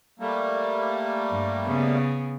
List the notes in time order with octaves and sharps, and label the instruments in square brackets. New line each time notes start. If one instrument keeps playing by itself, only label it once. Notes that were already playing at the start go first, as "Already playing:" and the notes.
[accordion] G3 A3 A#3
[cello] G2
C#3 B3